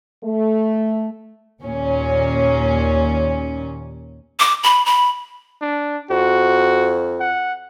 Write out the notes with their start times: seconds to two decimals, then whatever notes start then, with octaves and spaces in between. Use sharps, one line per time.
0.23 A3
1.61 D#2 A#2 C#4
4.39 D6
4.63 B5
4.86 B5
5.61 D4
6.10 F2 F#4
7.20 F#5